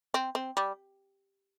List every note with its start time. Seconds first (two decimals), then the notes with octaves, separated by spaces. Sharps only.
0.14 C4
0.35 C4
0.57 G3